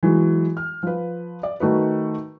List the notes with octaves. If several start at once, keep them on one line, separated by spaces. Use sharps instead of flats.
E3 F#3 G#3
F6
F3 B4
D5
D#3 A3 F#4 B4